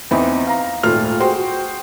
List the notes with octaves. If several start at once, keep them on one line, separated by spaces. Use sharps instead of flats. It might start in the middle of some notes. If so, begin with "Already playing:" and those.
E2 E3 C4 D#4 E5 B5
F5 A#5
D#1 G#1 A3 F4 F6
F#4 G#4 C5 G5 C6